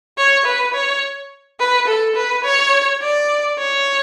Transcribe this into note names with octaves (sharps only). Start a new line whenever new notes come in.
C#5
B4
C#5
B4
A4
B4
C#5
D5
C#5